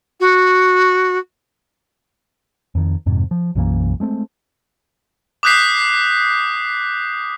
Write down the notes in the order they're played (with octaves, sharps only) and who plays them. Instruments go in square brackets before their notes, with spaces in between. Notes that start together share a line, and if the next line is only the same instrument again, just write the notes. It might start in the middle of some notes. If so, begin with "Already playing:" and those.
[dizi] F#4
[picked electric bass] F2 D#3
F2 G#2 C3
F3
B1 F#2 E3 A#3
G#3 A3 C4
[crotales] D6 D#6 F#6 G6 B6 C7